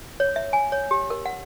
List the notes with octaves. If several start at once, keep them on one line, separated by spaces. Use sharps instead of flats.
C#5
E5
G#5
C#5
G4
A#4
F#5